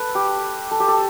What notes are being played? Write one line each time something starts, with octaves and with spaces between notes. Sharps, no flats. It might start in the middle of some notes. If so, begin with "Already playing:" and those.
Already playing: A4 B4
G4
A4
G4
A4